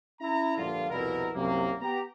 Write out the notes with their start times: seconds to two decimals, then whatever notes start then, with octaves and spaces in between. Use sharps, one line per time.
0.21 C#4 E4 A#5
0.58 A#1 G2 D3 F4
0.91 C2 F2 B2 E4 A#4
1.35 C2 F#2 C3 F#3 A#3
1.81 B3 G4 A#5